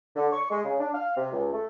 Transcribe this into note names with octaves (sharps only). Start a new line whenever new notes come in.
D3
C#6
G#3
C#3
D4
F5
C3
C#2
A3